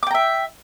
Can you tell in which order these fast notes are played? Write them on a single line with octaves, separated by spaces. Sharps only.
D6 G5 A#5 E5